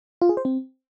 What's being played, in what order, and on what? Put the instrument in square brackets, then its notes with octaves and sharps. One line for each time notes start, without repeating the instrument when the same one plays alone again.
[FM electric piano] F4
G#4
C5
C4